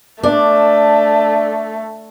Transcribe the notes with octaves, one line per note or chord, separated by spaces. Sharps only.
A3 D4